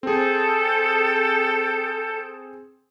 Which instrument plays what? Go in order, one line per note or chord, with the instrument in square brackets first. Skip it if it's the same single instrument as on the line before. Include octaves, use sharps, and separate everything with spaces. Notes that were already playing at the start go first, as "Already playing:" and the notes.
[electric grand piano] C4 G#4 [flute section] A4 G5 G6